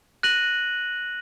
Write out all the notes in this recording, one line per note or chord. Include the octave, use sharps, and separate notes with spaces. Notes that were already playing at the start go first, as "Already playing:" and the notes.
F#6 A#6 D#7 F#7